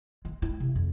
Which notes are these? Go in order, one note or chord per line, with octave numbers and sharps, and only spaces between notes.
G#3
E4
C3
F2